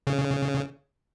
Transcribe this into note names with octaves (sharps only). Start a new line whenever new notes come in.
C#3